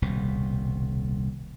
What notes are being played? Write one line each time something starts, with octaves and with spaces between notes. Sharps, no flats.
D#1 C2 B2